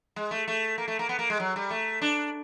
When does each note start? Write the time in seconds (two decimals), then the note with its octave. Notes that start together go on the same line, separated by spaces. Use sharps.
0.16 G#3
0.31 A3
0.48 A3
0.78 A#3
0.88 A3
0.99 A#3
1.09 B3
1.19 A#3
1.30 G#3
1.40 F#3
1.56 G3
1.71 A3
2.01 D4